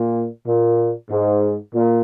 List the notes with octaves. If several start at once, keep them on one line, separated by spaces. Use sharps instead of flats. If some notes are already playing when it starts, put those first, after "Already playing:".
Already playing: A#2
A#2
G#2
A#2